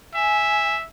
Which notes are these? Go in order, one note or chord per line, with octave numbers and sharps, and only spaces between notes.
E5 G#5